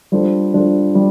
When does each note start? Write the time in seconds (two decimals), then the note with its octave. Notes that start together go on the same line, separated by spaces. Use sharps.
0.12 G3 D4 F4 A4 C5
0.54 G3 D4 F4 A4 C5
0.95 G3